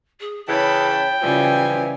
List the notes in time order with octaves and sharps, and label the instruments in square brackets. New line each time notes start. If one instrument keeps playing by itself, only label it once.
[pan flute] G#4
[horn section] C#3 E3 [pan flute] C#5 [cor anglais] G5 [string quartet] A5 B5
[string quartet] C#3 G3 G#5 [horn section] E3 F3 [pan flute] F4